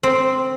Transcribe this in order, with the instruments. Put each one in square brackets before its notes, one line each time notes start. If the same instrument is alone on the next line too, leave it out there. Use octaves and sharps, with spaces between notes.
[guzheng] C4